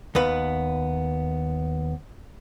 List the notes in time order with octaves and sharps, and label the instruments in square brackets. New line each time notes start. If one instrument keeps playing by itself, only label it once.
[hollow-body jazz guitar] D#2 B3 B4